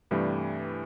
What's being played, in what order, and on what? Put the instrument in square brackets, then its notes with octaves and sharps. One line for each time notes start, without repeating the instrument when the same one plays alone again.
[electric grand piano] G2 C3 E3 G3 A3